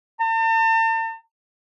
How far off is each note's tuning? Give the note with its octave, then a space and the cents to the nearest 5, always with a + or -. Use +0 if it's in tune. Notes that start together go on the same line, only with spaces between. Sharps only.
A5 +45